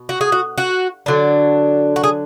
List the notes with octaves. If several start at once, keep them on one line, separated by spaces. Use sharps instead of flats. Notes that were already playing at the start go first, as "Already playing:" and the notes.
Already playing: B2
F#4
G#4
F#4
F#4
D3 F#3 D4
F#4
G#4